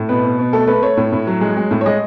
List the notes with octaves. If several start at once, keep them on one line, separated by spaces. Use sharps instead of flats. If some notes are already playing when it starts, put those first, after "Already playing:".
Already playing: A2
B2 B4
B2
B2
A3 A4
A3 B4
A3 C#5
A2
A2
F#3
G#3
G#3
A2
C#5
G#3 D#5